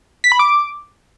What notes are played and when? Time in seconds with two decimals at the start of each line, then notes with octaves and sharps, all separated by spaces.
0.24 B6
0.32 B5
0.39 D6